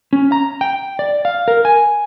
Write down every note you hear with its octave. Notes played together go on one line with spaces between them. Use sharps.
C#4
A#5
G5
D5
F5
A#4
G#5